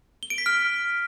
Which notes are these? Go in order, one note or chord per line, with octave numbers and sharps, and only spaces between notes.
G7
D7
B6
F6